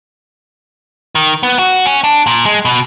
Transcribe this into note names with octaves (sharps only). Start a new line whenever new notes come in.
D#3
B3
F#4
C#4
D4
A#2
G#3
B2